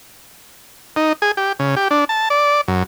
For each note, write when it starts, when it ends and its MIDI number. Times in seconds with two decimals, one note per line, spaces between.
0.96 1.13 63
1.22 1.32 68
1.37 1.52 67
1.59 1.75 49
1.76 1.88 67
1.91 2.05 62
2.09 2.29 81
2.30 2.61 74
2.68 2.83 42